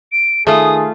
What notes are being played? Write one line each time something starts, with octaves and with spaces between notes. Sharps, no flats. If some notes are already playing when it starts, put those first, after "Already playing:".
D7
D#3 A3 F4 G#4 D#6